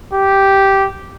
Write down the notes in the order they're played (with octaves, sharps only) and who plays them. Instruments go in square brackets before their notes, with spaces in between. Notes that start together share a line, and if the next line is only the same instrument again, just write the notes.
[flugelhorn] G4